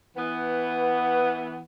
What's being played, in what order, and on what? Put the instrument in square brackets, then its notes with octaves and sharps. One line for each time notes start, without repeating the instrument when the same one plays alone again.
[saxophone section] E3 B3